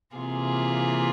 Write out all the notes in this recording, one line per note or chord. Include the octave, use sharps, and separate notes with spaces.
C3 E3 A#3 F4 G#4